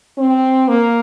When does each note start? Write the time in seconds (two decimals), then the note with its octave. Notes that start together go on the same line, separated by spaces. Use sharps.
0.18 C4
0.68 A#3